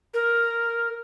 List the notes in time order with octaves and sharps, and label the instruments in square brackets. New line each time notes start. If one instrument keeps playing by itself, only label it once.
[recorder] A#4